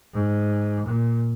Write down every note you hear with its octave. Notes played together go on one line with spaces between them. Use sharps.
G#2
A#2